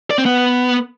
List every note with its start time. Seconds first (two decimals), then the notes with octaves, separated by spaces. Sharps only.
0.10 D5
0.18 C4
0.26 B3